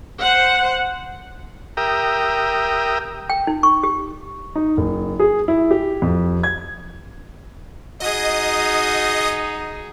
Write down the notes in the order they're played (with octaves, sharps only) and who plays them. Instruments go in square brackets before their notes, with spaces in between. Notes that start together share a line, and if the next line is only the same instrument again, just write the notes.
[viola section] C5 F#5
[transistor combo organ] G4 A#4 E5 G5 A#5 D#6
[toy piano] G5
D#4
C#6
G4
[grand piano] D#4
F#1
G#4
E4
G4
F2
G#6
[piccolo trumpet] D#4 [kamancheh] F#4 G#4 [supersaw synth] D#5 D#6